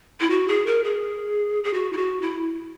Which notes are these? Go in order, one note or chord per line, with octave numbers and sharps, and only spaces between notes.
E4
F#4
G#4
A#4
G#4
G#4
F#4
E4
F#4
E4